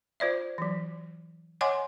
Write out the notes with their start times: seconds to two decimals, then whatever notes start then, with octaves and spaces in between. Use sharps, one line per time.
0.20 F4 C5 D5 E5
0.58 E3 F#3
1.61 C#5 D#5 F#5 G#5 C6 D6